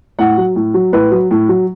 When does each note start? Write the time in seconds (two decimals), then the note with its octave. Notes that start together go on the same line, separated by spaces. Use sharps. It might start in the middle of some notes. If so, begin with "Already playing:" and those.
0.19 A2 F#5
0.37 F#3
0.56 A2
0.74 F#3
0.93 A2 B4
1.11 F#3
1.31 A2
1.49 F#3